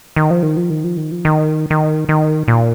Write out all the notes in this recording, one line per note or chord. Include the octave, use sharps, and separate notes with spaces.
D#3
F3
D#3
F3
D#3
F3
D#3
F3
D#3
D#3
D#3
A#2